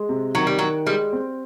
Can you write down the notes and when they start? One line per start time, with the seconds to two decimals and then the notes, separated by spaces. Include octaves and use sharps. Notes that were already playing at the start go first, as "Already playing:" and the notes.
Already playing: G#3
0.09 C3
0.35 D#3 F#3
0.47 G3
0.59 D#3 F#3
0.86 G3 G#3
1.13 C4